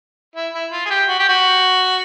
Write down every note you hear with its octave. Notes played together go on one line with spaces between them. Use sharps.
E4
E4
F4
G#4
G4
F#4
G4
F#4